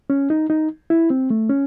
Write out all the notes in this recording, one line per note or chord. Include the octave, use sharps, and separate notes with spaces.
C#4
D#4
D#4
E4
C4
A3
C#4